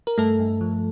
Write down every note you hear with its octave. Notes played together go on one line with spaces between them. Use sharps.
A#4
G2 A3 A4
G2
F3